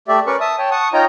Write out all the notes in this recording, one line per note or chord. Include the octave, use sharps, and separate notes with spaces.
A3 G4 D5 E5
C#4 A#4 B4 D5 C#6
E5 A5 D#6
C#5 G5 A5
F#5 A5 C#6 D#6
D#4 F4 C#5 D#5 G5 A#5